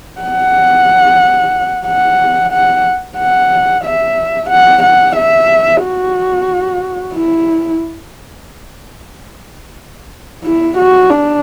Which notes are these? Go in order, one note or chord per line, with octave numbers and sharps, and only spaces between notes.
F#5
F#5
F#5
F#5
E5
F#5
F#5
E5
F#4
E4
E4
F#4
D4